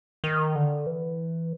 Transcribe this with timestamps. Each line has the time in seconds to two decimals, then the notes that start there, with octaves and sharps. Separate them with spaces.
0.24 D#3
0.55 D3
0.86 E3